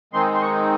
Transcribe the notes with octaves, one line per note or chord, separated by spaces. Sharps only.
D#3 G#3 C4 D#4 C6
C6
C#6